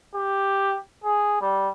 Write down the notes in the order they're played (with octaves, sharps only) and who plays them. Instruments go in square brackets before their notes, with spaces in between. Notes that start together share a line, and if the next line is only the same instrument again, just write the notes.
[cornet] G4
G#4
G3